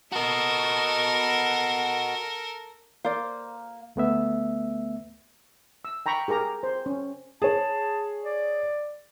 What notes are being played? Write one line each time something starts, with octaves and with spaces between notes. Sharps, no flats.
F#4 A4 A#4 D#5
A#3 C5 D5
D2 A3 B3 E5
E6
G5 A#5 B5 C#6
G4 G#4 A#4 A#5
C5
C#4
G#4 C#5 A5
D5